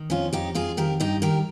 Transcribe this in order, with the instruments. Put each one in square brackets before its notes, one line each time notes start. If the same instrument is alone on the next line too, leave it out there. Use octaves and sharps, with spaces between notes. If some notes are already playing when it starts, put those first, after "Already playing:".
Already playing: [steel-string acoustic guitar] D#3
F2 C#4 F4
F2 D#4 G4
F2 F4 G#4
D#3 G4 A#4
G2 D#4 G4
D#3 G4 A#4